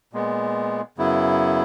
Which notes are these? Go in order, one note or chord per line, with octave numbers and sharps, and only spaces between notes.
A#2 G#3 B3
F#2 C#3 F#3 B3 E4